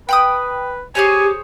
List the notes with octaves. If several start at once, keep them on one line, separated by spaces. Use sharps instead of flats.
B4 G5 B5 D#6
G4 G#4 C5 C#5 G#5